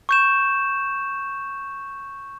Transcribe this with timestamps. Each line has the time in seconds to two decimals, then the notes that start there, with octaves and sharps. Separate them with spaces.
0.09 C#6 G6 E7